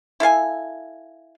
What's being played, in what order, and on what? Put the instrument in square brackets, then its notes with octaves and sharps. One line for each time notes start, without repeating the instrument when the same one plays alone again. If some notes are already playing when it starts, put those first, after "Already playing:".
[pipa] E4 A4 F5 G#5